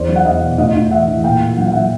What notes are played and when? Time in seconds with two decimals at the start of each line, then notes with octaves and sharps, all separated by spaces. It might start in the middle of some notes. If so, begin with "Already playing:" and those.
Already playing: E2 C5 D5
0.09 F#3
0.16 F#5
0.25 E2 D#5 F5
0.42 B2
0.58 A2 D#5 F5
0.75 A2
0.91 E3 E5 F#5
1.08 E3
1.24 A#2 F5 G5
1.41 A#2
1.57 F#3 F#5
1.64 F5
1.72 F#3 E5 F#5